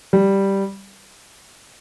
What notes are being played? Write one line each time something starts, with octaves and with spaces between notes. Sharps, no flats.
G3